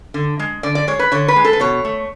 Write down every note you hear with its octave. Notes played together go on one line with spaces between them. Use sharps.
D3
G#3
D3 D5
D5
G#3 C#5
B4
D3 C#5
B4
G#3
A4
B4
B2 C#5
A3